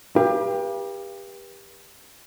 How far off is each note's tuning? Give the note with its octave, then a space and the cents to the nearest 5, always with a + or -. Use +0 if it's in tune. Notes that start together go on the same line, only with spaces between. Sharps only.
G4 +20 B4 -40 F5 -30